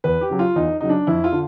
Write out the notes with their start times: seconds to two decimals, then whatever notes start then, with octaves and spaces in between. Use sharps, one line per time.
0.04 E2 B4
0.21 G4
0.30 C#3 F#3
0.39 F4
0.55 E2 D#4
0.80 C#3 F#3 D#4
0.89 D4
1.07 F2 E4
1.24 F4
1.32 D3